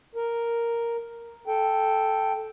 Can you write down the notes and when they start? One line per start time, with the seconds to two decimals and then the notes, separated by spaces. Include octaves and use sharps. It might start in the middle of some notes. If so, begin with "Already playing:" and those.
0.15 A#4
1.47 A4 G5